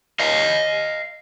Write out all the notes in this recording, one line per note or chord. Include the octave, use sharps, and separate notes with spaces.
D#5 F5